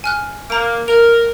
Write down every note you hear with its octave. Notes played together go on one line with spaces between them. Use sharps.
G#5 F6 F#6
A#3 A#5 D7
A#4 F7